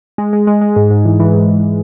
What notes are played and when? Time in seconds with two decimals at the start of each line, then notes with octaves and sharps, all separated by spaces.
0.18 G#3
0.33 G#3
0.47 G#3
0.61 G#3
0.76 G#2
0.90 G#2
1.05 E3
1.20 E3
1.34 G#2
1.48 E3